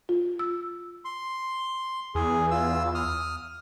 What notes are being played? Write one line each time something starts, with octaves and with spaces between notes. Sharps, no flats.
F4
E6
C6
E2 G#4
F4 E6
D#6 F6